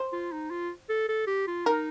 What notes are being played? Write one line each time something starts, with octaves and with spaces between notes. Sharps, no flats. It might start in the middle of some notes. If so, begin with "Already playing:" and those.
Already playing: C5
F4
D#4
F4
A4
A4
G4
F4
D#4 A#4